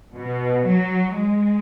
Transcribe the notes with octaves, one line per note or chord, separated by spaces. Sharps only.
B2
F#3
G#3